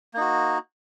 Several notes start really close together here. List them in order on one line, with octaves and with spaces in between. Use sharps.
A#3 D#4 F#4